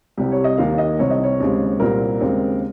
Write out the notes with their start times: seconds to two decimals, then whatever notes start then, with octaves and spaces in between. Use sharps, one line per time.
0.18 C2 C3 G3 C4 G4
0.32 C#5
0.44 D#5
0.58 D#2 D#3 A#3 F5
0.78 D#5
0.99 C2 C3 G3 C4 C#5
1.10 D#5
1.24 C#5
1.40 D#2 C#3 G#3 C4
1.80 C2 A#2 G3 C4 A#4
2.20 D#2 C#3 G#3 C4